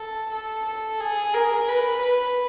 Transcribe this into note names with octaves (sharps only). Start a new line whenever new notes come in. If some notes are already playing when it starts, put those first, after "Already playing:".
Already playing: A4
A4
A4
G#4
A#4
B4
B4